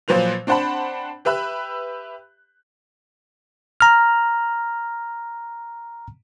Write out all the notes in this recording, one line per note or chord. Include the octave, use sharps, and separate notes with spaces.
A#2 F3 F#3 B4 C5 F7
C4 D4 C5 F#5 A5 B5
G4 B4 E5 B5 E6 F#6
A#5 F6